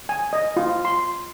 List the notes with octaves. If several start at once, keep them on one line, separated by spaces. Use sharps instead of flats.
G#5
D#5
F4
C6